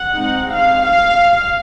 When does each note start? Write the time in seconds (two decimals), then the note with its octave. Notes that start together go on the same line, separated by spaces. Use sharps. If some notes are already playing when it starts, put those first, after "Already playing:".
Already playing: F#5
0.14 G#3 C4 D#4
0.48 F5
0.84 F5